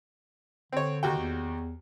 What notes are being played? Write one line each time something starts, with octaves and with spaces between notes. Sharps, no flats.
D3 C4 C#5
D#2 F#4 G5
E2